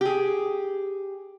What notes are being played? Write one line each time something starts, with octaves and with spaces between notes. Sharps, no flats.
G4 G#4